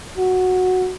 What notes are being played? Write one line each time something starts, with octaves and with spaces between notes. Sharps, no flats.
F#4